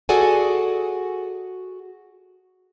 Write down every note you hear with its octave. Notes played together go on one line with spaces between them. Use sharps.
F#4 G#4 A4 D5 F#5 G#5